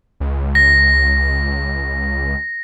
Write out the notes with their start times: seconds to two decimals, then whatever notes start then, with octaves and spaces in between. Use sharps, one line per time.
0.20 C#2
0.55 A#6